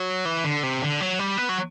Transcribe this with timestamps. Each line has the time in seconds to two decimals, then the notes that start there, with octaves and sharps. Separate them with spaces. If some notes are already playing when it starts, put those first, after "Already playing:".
Already playing: F#3
0.25 E3
0.44 D3
0.63 C3
0.82 D3
1.01 F#3
1.19 G3
1.38 B3
1.49 F#3